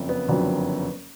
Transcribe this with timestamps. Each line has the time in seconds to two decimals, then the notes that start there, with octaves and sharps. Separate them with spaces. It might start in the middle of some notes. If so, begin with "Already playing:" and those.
Already playing: F#1 F2
0.09 B3
0.28 F#1 F2 D3 F#3